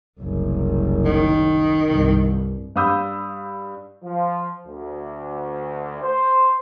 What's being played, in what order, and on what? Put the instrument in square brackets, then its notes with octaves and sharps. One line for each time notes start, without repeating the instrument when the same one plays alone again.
[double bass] F#1 C2
[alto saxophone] D#3
[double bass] C2 G2
[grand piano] G2 F5 B5 D#6 E6 G6
[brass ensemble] F3
D2
C5